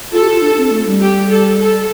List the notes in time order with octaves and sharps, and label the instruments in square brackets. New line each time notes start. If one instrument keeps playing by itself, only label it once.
[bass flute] F4 [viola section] A4
[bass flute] G4
F4
D4
C4
A3
G3
[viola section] G4
A4
A4